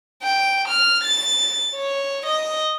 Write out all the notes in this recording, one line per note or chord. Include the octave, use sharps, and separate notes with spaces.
G5
F6
A6
C#5
D#5